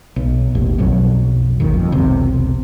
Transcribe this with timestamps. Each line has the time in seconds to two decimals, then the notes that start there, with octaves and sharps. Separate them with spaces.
0.16 B1
0.55 A1 D#2 A2
0.78 B1 F2 B2 F#3
1.60 G#1 D#2 D#3
1.74 F2
1.92 E1 B1 C3